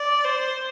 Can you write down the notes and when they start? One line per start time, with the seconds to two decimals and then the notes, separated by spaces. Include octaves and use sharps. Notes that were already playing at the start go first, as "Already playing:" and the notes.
Already playing: D5
0.25 C5